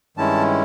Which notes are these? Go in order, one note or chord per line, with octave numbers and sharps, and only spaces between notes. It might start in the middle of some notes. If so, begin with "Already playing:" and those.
G2 D#3 G#3 C#4 E4 A5